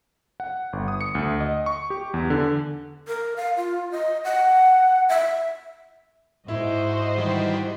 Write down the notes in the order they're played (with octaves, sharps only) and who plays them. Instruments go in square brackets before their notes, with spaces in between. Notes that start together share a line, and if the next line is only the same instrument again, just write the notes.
[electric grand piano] F#5
G1
D#6
C#7
D2
D#5
C#6
G4
E2
D3
[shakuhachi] A#4
F5
F4
D#5
F#5
E5
[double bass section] G#2 [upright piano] E4 [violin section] F#4 C5 D#5
[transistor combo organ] D#3 E3 G3